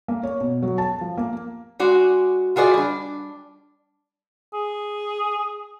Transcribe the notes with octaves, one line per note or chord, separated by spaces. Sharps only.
A#3
C#5
B2
F#3
A5
F3
A#3
G#3 F#4 D5
F4 F#4 G#4 D5 D#5
G3 D4
G#4